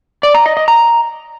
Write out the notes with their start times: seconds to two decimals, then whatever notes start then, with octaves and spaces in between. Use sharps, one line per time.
0.23 D5
0.34 A#5
0.46 D#5
0.57 D#5
0.68 A#5